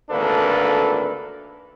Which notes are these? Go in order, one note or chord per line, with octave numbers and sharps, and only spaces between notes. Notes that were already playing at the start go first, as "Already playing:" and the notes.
G#1 D2 A#3 D4 A4 B4